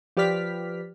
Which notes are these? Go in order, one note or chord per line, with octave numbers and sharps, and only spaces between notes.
F3 G4 B4 D5 F6 B6